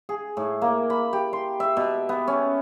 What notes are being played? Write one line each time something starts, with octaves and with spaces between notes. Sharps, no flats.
G#4
A2
A#3
B5
G4
C6
E5
B2
B3
C#4